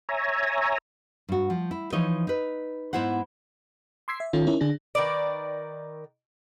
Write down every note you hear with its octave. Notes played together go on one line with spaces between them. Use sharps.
C#5 E5 G#5 A#5
G2 F#4
F3
E4
E3 F3 D#4 C#5 D#5
D#4 B4
G#2 B3 E4 C5 F#5
C6 D6 E6 G#6 B6 C7
E5
D#3 C#4 F4 A4
C#4 D#4 E4 A#4 C#5
D3 D4 G#4 A#6
D#3 A#4 B4 D5